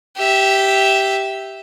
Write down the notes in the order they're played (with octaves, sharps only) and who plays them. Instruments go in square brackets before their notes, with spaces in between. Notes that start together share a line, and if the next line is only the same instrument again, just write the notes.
[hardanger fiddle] G4 E5